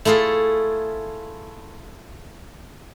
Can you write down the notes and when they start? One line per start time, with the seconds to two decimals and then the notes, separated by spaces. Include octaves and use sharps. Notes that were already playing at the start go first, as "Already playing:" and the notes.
0.05 A3 E4 F4 G#4 A4